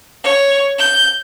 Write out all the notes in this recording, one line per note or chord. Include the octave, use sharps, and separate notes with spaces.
C#5
G6